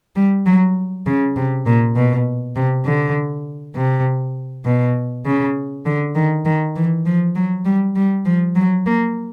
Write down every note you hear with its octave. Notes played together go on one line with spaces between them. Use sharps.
G3
F#3
C#3
C3
A#2
B2
C3
D3
C3
B2
C#3
D3
D#3
D#3
E3
F3
F#3
G3
G3
F3
F#3
A#3